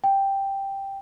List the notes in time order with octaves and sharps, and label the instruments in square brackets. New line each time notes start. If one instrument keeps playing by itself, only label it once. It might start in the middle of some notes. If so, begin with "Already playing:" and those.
[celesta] G5